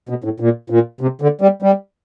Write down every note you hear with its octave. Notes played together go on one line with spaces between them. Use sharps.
B2
A2
A#2
A#2
C3
D3
G3
G3